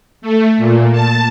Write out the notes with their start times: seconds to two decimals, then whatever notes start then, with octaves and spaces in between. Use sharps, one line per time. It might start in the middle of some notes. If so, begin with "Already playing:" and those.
0.22 A3
0.58 A#2
0.92 A5